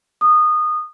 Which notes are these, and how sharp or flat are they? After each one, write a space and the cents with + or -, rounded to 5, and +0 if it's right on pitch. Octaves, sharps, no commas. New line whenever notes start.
D#6 -20